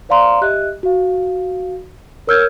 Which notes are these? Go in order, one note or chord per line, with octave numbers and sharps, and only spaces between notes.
C5 D5 F5 A#5 C6
G4 D#5 E5 F#6
F#4 F5
A#4 C#5 E6 F6 G6 G#6